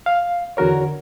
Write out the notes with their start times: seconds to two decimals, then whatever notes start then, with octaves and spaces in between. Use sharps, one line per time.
0.06 F5
0.57 E2 D3 F#4 A#4 C#5